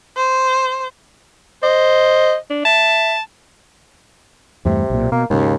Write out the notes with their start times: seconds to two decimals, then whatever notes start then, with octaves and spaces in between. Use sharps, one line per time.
0.17 C5
1.63 C5 D#5
2.50 D4
2.65 E5 A5
4.65 E2 G2 C3 A3
4.90 B1 A#2
5.12 B2 A#3
5.30 D#2 G#2 C#3